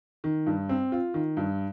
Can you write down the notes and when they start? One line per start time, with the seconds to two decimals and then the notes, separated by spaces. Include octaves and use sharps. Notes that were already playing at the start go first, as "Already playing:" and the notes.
0.24 D#3
0.46 G2
0.69 C4
0.92 F4
1.14 D#3
1.37 G2